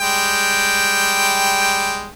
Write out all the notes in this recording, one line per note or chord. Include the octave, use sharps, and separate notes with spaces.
G3 G#3 G5